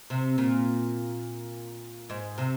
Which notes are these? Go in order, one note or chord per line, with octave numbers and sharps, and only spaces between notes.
C3
A#2
G#2
C3